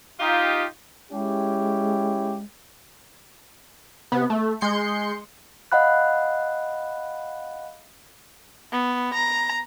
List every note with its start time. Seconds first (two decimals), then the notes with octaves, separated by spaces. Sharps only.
0.20 D#4 F4 G4
1.12 G#3 C#4 E4 G4
4.12 C3 B3
4.30 A3
4.61 G#3 C6 G6 C#7
5.72 D#5 F5 F#5 B5 F#6
8.72 B3
9.14 A#5